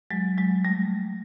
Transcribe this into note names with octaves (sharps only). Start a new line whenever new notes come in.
F#3 G#3
F#3 G#3
G3 A3